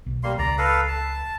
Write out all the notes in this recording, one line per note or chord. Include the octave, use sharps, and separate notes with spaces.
B1
G3 A#3 C6
C#2 D5 A#5
A4 B4 F5
A5